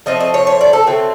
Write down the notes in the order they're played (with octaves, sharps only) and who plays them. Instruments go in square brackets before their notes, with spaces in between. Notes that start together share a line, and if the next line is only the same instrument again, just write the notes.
[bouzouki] F3 A3 C4 D#5
D#5
C#5
C#5
D5
A4
D3 F#3 A3 C4